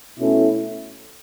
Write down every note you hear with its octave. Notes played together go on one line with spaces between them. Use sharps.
B2 A3 C#4 E4 A4